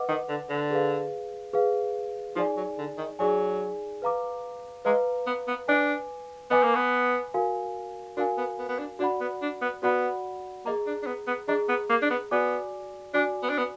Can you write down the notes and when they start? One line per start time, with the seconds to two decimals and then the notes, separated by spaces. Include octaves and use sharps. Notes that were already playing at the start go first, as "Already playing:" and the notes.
Already playing: B4 D#5 F#5 D6
0.08 D#3
0.29 D3
0.50 D3
0.71 G#4 B4 F5
1.53 G#4 B4 F5
2.36 F3 D#4 G#4 D5 G#5
2.56 F#3
2.78 D3
2.98 D#3
3.19 F#3 D#4 G#4 D5 G#5
4.02 B4 F5 A#5 D6
4.85 G#3 B4 F5 A#5 D6
5.26 B3
5.47 B3
5.68 D4 B4 D#5 G#5 D6
6.50 B3 B4 D#5 G#5 D6
6.63 A#3
6.75 B3
7.34 F#4 A#4 F5 G#5
8.17 D4 F#4 A#4 F5 G#5
8.38 B3
8.58 B3
8.68 B3
8.79 D4
8.99 D4 F#4 D5 F#5 B5
9.20 B3
9.42 D4
9.62 B3
9.83 B3 F#4 D5 F#5 B5
10.65 A#3 G#4 D#5 A#5
10.87 D4
11.02 D4
11.06 B3
11.27 B3
11.48 D4 G#4 D#5 A#5
11.69 B3
11.89 A#3
12.02 D4
12.10 B3
12.31 B3 F#4 D5 G#5 D6
13.14 D4 F#4 D5 G#5 D6
13.43 B3
13.50 D4
13.58 B3